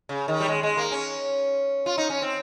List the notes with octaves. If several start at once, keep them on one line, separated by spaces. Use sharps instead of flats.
C#3
D#3
G3
G#3
G#3
A#3
C#4
F4
D#4
C#4
C4